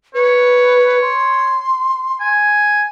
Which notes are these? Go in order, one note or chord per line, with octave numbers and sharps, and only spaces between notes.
B4 C#5
C6
G#5